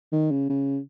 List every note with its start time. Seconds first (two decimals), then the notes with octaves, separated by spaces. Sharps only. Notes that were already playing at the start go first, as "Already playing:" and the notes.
0.12 D#3
0.31 C#3
0.50 C#3